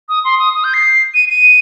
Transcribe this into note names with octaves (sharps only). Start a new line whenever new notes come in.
D#6
C6
D#6
D#6
G6
C7
D#7
D#7